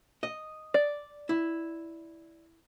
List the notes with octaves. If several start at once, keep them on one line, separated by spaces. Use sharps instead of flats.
D#5
D5
E4